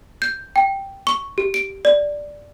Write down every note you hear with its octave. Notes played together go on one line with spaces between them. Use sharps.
G6
G5
C#6
G4
D7
D5